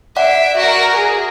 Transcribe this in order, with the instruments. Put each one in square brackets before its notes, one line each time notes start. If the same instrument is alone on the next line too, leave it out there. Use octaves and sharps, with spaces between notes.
[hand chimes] D5 F#5 [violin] E5 D7
[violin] F#4 A#4
G#4